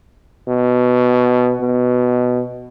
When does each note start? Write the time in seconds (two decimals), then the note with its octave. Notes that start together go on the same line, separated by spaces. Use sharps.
0.48 B2
1.61 B2